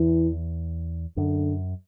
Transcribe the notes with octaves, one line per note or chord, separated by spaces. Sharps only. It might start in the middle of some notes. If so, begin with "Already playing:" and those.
Already playing: E2 E3
F#2 D3